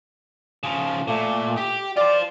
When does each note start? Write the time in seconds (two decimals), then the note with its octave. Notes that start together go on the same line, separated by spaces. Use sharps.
0.63 C#3 F3
1.08 A#2 A3
1.57 G4
1.97 F4 C5 D5